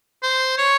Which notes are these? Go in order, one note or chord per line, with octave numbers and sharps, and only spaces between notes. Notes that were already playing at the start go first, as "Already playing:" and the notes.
C5
C#5